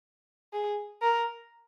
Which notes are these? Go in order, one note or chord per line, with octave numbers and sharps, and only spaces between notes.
G#4
A#4